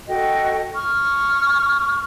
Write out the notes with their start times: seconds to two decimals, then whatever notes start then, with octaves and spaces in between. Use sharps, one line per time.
0.08 F#4 A4 D#5 G5
0.75 C#6 F6